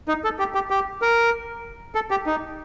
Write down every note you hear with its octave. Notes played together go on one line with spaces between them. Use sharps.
D#4
A4
G4
G4
G4
A#4
A4
G4
D#4